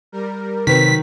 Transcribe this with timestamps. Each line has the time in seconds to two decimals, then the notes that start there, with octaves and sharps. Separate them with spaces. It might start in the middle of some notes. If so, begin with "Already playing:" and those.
0.12 G3 A#4
0.67 C3 D#3 F#3 C4 B4 B6